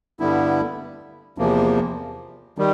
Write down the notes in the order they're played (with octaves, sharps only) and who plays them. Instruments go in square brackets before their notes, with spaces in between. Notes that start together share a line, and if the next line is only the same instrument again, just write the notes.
[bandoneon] G2 D3 G3 B3 E4
E2 C3 F3 A#3
D#3 G3